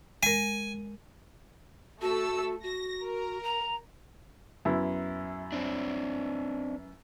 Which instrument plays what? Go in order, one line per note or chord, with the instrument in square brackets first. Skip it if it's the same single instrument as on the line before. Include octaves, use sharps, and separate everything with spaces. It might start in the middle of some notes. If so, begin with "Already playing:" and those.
[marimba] G#3 A#4 [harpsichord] G#5
[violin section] A3 A4 E6 [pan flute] F#4
[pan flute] F#4 [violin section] A#6
[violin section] A#4
[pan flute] A#5
[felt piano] F#2 B3 E4
[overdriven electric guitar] C4 D4